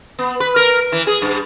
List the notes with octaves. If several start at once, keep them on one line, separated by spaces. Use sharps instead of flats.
B3
B4
A#4
E3
G#4
G2